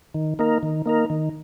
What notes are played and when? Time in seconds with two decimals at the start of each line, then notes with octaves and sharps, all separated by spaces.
0.14 D#3
0.39 A#3 D#4 A#4
0.63 D#3
0.86 A#3 D#4 A#4
1.10 D#3